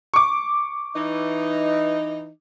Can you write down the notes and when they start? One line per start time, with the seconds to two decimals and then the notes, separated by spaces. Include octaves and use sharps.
0.14 C#6 D6
0.95 E3 D#4